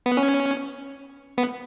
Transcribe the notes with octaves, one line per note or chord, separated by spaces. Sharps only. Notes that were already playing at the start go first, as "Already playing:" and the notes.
B3
C#4
B3